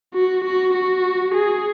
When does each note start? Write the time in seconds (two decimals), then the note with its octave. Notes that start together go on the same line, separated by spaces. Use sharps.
0.14 F#4
0.44 F#4
0.74 F#4
1.34 G#4